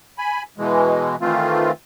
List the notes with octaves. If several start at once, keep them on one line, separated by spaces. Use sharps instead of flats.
G#5 B5
B2 E3 G#3
D#3 E3 A3 C4 F4